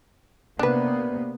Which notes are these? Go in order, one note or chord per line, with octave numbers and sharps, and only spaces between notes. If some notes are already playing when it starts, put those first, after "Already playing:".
C3 A#3 B3 D4 B4